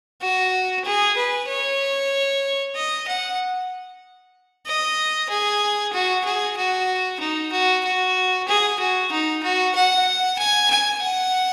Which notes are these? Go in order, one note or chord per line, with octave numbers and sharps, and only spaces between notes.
F#4
G#4
B4
C#5
D#5
F#5
D#5
G#4
F#4
G#4
F#4
D#4
F#4
F#4
G#4
F#4
D#4
F#4
F#5
G#5
G#5
F#5